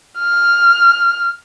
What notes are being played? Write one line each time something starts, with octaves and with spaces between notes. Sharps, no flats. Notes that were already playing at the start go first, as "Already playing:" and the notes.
F6